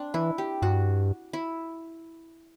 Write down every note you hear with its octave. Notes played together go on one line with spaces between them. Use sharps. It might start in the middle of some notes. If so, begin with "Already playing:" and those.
Already playing: C4 D4
E3 E4
G4
G2 F#4
E4